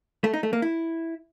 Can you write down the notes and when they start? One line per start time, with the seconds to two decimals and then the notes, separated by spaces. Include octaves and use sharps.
0.24 A3
0.34 D#4
0.43 A3
0.53 A#3
0.62 E4